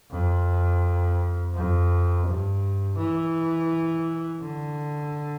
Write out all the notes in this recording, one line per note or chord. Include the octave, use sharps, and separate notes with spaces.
F2
F2
G2
E3
D3